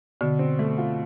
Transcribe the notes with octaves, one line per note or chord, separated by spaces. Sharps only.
B2 D3
C4
A3
F4